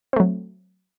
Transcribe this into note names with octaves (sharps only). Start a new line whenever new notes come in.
F#3 A3 C4